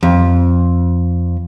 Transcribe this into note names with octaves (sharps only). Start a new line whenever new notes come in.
F2